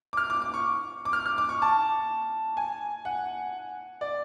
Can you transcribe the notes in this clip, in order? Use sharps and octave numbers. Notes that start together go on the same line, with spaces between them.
D6
F6
D6
D6
C#6
D6
F6
F6
D6
C#6
A5
G#5
F#5
D5